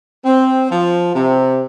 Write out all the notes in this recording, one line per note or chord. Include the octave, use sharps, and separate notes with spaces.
C4
F3
C3